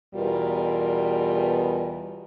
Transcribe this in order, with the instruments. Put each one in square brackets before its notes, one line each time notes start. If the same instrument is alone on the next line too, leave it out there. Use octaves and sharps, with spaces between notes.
[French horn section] E2 B2 G3 F4 A#4